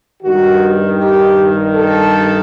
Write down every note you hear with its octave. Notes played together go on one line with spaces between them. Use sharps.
G2 D#3 F#4
G4
A4